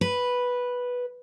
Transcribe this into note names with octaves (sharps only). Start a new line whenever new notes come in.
B4